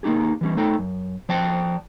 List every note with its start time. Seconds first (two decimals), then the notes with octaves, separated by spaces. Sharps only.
0.03 A#3 B3 D#4 G4 G#4
0.41 E3 G3 C#4
0.57 A3 D#4 A4 G5
0.79 F#2
1.29 F3 C5 D5 G5 A5